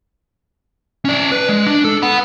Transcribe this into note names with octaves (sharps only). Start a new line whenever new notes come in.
C#4 D5
B4
G#3
D4
A4
F#5 B5